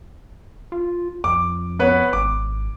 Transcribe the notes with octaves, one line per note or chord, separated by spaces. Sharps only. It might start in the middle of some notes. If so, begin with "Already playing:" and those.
F4
F2 D6
B3 B4 C#5
G#1 D6